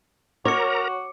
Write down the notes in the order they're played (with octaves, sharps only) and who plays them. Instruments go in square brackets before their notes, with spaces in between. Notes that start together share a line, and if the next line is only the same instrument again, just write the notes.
[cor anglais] F#4 [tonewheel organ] A#4 A#5 [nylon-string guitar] C#5 [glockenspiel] D6 C#7